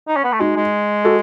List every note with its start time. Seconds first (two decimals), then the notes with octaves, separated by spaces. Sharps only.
0.08 D#4
0.16 C#4
0.24 B3
0.32 A3
0.40 G#3 D#4 F#4
0.56 G#3
1.05 F#4 A4